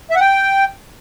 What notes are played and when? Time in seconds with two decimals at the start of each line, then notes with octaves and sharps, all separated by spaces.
0.11 E5
0.16 F#5
0.21 G5